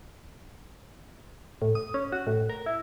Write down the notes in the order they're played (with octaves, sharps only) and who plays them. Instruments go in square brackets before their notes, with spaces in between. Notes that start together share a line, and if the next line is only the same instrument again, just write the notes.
[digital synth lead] A2
D#6
C#4
F#4
A2
A#4
E4